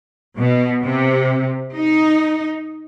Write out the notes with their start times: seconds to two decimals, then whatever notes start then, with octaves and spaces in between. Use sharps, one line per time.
0.38 B2
0.84 C3
1.75 D#4